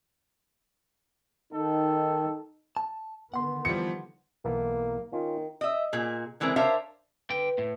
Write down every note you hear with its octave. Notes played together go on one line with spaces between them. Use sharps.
D#3 D#4 A4
A5
D3 D#3 B3 F#5 C6
E3 F3 G3 C#7
B1 E3 A#3 B3
D#3 C#4 F4
D#5 E5
A#2 G#4
D3 E3 G#3 C4 A#4 E5
D4 A#4 C5 C#5 E5 F5
D3 B4 G5
A2